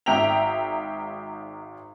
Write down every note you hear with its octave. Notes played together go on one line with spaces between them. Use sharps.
G#1 E5 G5 A#5 F7